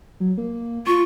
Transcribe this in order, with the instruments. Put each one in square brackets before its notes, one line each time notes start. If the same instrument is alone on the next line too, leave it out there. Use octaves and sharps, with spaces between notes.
[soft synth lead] F#3
A#3
[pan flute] F4 [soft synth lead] C#6